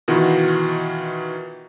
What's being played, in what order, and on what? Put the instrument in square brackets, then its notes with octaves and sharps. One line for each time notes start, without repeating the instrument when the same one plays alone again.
[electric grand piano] B2 D#3 E3 F4 F#4